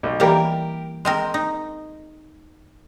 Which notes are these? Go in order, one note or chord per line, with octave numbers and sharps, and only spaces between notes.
B1
E3 G3 A#3 G4 A#4
G#3 C4 A#4 C6
D#4